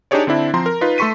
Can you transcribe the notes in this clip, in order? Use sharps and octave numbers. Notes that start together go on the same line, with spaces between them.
D4 D#4 G4 G#4 C#5 D5
D3 C4 D4 E4
F3 C4 A#5 C6
A#4
D#4 F4 B4
A3 A4 C6 C#6 B6 D#7